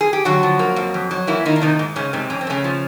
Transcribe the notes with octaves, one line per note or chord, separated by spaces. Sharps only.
G#4
G4
D3 F#3 F#4
F3
A#3
F2
F2
F#3
E3 A#3 E4
D#3 A#3 D#4
D4
C3 D#3 D#4
G#2
G#2 C#3 C#4
G#2 C3 C4
F2 C#4
C4
C#3 A3 C#4
F3